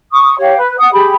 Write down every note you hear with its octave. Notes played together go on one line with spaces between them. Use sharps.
C#6 D#6
G4 C#5 F5
B4
F#5 D#6
G4 G#4 B5